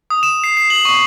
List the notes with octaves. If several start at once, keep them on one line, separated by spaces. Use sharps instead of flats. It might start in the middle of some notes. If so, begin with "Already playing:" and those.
D#6
E7
C7
C7
F#7
C#6